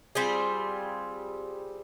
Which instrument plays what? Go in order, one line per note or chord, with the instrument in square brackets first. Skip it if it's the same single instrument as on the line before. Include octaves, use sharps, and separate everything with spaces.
[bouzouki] G3 C4 F4 G#4